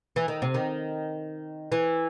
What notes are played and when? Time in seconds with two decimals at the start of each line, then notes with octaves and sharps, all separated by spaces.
0.16 E3
0.28 D#3
0.42 C3
0.54 D#3
1.72 E3